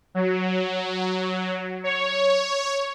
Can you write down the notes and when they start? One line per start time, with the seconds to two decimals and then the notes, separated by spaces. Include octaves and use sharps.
0.15 F#3
1.84 C#5